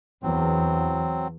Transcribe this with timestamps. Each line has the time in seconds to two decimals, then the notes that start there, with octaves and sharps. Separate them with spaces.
0.23 E2 F#3 C4